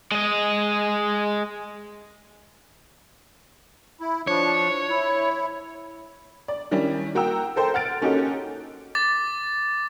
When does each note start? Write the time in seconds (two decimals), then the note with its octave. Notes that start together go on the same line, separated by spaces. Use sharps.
0.12 G#3 D#5
4.01 E4
4.27 F3 D4 C#5
4.89 E4
6.48 D5
6.71 D#3 G3 C#4 D4 E4
7.15 A#3 F#4 G5 A#5 E6
7.56 A4 A#4 C5 G5
7.74 F#5 F6 A6 D7
8.01 A#3 C#4 D#4 F#4 G4 A4
8.95 D6 A6